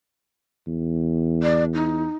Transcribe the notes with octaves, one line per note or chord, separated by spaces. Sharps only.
E2
D5
D#4